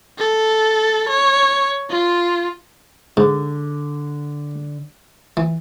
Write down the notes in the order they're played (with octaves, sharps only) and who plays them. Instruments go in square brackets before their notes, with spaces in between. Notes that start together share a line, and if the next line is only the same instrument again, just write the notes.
[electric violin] A4
C#5
F4
[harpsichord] G#2 [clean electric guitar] D3
[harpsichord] E3